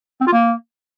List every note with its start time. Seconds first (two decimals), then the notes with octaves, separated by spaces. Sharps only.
0.21 C4
0.27 F4
0.33 A#3